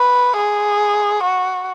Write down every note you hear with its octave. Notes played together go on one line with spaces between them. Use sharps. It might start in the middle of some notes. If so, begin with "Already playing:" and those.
Already playing: B4
G#4
F#4